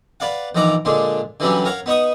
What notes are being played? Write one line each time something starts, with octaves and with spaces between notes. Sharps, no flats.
B4 D5 F5 F#5
A#1 D#3 E3 F#5 A#5 D6
A#2 D3 G#3 D4
D3 E3 F#3 G3 C#4 D4
A#4 C#5 F5 F#5
B3 D#4 C#6 D#6